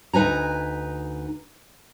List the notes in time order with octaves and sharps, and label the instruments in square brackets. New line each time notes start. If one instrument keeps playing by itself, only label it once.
[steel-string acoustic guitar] D2 D#4 B4 G#5 A#5